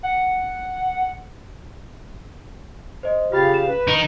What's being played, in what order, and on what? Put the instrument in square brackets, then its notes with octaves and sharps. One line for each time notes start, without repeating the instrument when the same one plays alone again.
[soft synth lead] F#5
[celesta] C5 D#5
[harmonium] C#3 G4 F5 [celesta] F4 B5 A6
[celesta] E7
[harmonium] B4
[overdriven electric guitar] D#3 D#4